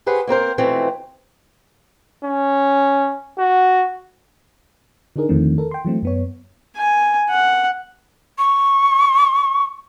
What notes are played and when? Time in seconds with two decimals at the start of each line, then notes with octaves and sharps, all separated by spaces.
0.06 G4 G#4 B4 C5 F#5
0.27 A#3 C4 A#4 C5
0.58 B2 E3 F3 A3 C4
2.25 C#4
3.39 F#4
5.16 D3 D4 D#4 G#4 A#4
5.29 E2 D3 D#3 F3 A3 C4
5.58 A4 A#4
5.71 G5 C6
5.85 E3 F#3 A3 C4
6.03 F#2 B3 C#5
6.77 G#5
7.30 F#5
8.38 C#6